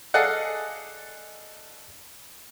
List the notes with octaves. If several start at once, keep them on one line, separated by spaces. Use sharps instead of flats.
G#4 A4 D5 D#5 F5 F#5